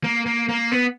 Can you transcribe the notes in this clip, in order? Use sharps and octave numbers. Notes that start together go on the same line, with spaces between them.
A#3
A#3
A#3
B3